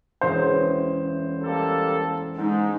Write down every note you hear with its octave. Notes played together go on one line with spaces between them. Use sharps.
E1 C#4 E4 C5
G3 A#3 A4
G#2 G#3 D#4